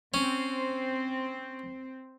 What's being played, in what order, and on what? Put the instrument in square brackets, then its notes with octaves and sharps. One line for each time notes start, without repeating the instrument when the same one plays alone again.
[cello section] C4 [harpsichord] C#4